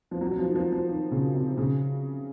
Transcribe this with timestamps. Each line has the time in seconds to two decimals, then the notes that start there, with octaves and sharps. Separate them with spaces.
0.11 F3
0.21 F#3
0.31 F#3
0.39 F3
0.47 D#3
0.55 F3
0.72 F3
0.89 D#3
1.11 C#3
1.34 C3
1.57 C#3